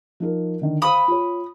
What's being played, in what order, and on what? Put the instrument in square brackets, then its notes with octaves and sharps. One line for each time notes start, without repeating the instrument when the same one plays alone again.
[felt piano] F3 D#4 A#4
D3 D#3
[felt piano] C5 F5 [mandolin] B5 D#6
[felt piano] F4 C#5